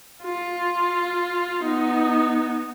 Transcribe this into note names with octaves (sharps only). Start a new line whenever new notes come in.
F4
B3 D#4